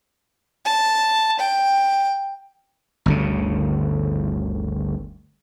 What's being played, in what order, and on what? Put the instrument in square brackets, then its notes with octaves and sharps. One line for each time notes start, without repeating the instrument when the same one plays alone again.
[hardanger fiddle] A5
G5
[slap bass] G1 D2 C#3